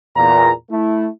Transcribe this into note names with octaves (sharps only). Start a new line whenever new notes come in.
E2 A#2 A#5
A3 E4